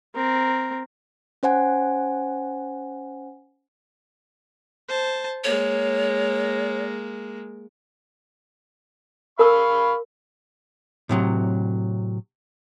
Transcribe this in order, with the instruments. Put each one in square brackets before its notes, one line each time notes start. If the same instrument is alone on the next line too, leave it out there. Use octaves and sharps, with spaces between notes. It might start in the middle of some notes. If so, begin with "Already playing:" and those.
[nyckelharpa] C4 A#4
[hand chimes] C#4 C5 F#5 G#5
[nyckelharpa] C5 A5
[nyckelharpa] G#3 A#3 [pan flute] C#5
[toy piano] A#4 A5 E6 [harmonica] F5 B5 C#6
[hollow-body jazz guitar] A2 C3 F#3